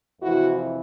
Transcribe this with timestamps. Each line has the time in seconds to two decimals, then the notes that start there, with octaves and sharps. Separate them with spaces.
0.21 F2 C3 E3 A3 E4 F#4